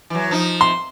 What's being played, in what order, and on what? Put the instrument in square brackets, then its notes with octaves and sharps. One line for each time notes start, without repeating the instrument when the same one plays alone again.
[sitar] E3 F#3
F3 D#4
[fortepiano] C6